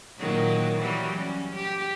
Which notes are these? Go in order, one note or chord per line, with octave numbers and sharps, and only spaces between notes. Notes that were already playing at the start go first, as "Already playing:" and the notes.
A#2 D#3 F#3
E3 F#3 G3
C#4
G4